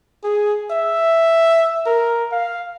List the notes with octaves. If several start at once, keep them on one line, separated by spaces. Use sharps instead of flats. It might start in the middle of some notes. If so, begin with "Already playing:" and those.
G#4
E5
A#4
F5